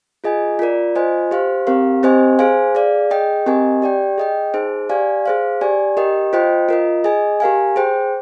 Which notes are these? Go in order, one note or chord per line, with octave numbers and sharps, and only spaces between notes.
F4 G#4 D#5 G#5
F4 A#4 D5
F4 C5 D#5 G#5
G4 C5 F5
C4 G4 A#4 F5
C4 G4 C5 D#5 G#5
G#4 C5 F5 G#5
G#4 D5 F5
G#4 D#5 G5
C4 G4 A#4 D#5 G#5
G4 D5 G5
G#4 D#5 G5
D#4 G#4 C5
G4 D5 F5 G#5
G#4 C5 F5
G4 D5 G#5
G4 A#4 D#5 G5
F4 C5 D#5 G5
F4 A#4 D#5
G#4 D#5 G#5
G4 A#4 F5 G#5
G#4 C5 G5